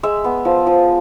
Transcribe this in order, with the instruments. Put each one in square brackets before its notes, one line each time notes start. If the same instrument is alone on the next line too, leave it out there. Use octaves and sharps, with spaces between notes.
[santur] G#3 E5
B3
F3
F3